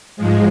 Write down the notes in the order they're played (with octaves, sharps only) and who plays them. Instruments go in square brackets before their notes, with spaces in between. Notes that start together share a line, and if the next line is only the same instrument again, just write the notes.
[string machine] G#2 F3 G#3